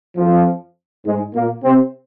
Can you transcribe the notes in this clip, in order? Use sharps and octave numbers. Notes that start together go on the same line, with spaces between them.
F2 F3
G#2 G#3
A#2 A#3
C3 C4